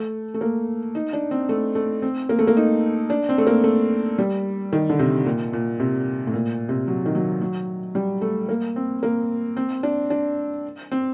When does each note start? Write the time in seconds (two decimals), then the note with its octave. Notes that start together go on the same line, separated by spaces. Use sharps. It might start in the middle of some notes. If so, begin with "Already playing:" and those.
Already playing: A3
0.34 A3
0.41 A#3
0.95 D#4
1.13 D4
1.31 C4
1.49 A3
1.75 A3
2.02 C4
2.29 A#3
2.39 A3
2.47 A#3
2.57 D#4
3.10 D4
3.29 C4
3.38 A3
3.47 A#3
3.64 A3
4.19 G3
4.73 D#3
4.90 D3
4.99 C3
5.26 A#2
5.53 A#2
5.80 C3
6.27 A2
6.34 A#2
6.69 C3
6.88 F#3
7.06 D#3
7.15 F#3
7.42 F#3
7.95 G3
8.21 A3
8.49 A#3
8.76 C4
9.03 A#3
9.57 C4
9.83 D4
10.10 D4
10.92 C4